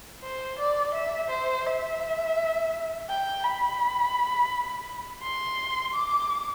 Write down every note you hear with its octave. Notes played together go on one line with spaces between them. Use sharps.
C5
D5
E5
C5
E5
G5
B5
C6
D6